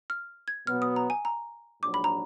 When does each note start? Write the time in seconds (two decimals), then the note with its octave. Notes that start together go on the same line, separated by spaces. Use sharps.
0.10 F6
0.48 G#6
0.67 B2 F#3 B3 F6
0.82 D#6
0.96 A#5
1.10 G#5
1.25 A#5
1.82 A#1 G#2 F#3 D4 D6
1.94 B5
2.04 A#5